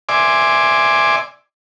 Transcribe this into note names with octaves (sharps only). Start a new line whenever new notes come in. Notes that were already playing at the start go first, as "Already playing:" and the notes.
D5 E5 G#5 C6 D6